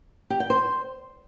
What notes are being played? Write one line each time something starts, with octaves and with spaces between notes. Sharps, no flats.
G4
G5
C5